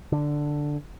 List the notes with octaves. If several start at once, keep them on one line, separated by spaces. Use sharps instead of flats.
D3